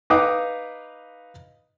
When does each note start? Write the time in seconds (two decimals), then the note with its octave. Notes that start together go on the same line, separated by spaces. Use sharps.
0.10 D#4 B4 F5 D6 D#6